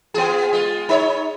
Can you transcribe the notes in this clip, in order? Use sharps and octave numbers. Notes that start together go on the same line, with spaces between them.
B3 F4 G#4
G#3 F4
D#4 B4 C#5